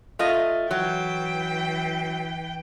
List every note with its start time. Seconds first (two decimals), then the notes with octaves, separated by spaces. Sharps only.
0.19 A3 F4 D#5
0.71 E3 F#3 G5